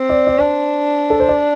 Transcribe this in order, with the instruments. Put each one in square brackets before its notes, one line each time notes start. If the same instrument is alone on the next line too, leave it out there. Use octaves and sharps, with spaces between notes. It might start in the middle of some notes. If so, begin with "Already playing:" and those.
Already playing: [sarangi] C4
[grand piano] D5
D5
[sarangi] D4 [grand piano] C5
[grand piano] A4
C5
D5